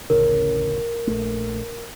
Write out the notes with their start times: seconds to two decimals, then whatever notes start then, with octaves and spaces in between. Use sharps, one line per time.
0.10 A1 D2 C#3 A#4
1.07 A#1 A3